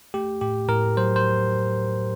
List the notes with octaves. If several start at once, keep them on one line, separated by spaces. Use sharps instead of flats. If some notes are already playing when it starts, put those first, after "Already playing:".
A3 G4
A2 G4
A2 A#4
F#3 C5
C5